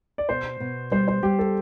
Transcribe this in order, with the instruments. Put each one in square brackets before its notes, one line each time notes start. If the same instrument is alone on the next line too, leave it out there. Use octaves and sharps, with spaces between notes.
[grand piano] D5
[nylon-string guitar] B2 [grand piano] C5
[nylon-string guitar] B2
[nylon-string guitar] G3 [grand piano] C5
[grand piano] C5
[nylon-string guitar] G3 [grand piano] G4
[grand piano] A4